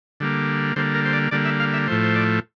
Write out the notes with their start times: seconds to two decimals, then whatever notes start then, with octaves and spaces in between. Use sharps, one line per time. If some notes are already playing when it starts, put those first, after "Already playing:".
0.20 D3 G3 A#3
0.76 D3 G3 A#3 C5
0.94 A#4
1.05 C5
1.13 D5
1.31 D3 G3 A#3 D5
1.45 E5
1.60 F5
1.73 E5
1.87 A2 F3 A3 C5
2.04 C5
2.16 D5